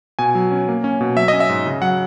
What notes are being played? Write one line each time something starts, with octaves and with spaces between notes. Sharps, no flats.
B2 G#5
F#3
C#4
A#3
C#4
B2
F#3 E5
C#4 D#5
E5
G#2
C#3
F#3 F#5